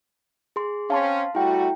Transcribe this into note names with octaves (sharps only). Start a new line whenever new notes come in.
G#4 C6
C4 C#4 F5 A5 C6
G3 A3 E4 F#4 G5